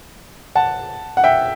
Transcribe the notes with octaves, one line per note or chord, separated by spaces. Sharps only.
F#5 A5
F#5
E5 G5